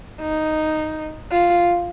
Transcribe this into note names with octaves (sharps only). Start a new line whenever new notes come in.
D#4
F4